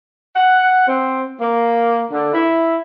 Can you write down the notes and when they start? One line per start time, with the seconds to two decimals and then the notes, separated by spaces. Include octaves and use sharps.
0.35 F#5
0.88 C4
1.41 A#3
2.10 D3
2.33 E4